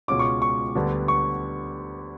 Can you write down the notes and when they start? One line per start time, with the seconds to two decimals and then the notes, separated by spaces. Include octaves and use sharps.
0.08 C#2 B2 G#3 C#4 F4 D6
0.19 C#6
0.42 C#6
0.75 D2 D3 G3 B3 D4
1.08 C#6